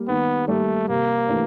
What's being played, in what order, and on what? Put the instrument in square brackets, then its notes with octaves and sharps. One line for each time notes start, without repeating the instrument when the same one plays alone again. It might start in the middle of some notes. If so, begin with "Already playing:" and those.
Already playing: [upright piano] G3 A#3
[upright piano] D#3 [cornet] B3
[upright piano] G3 A#3 [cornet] A3
[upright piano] C3 [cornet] A#3
[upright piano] E3 A3 D4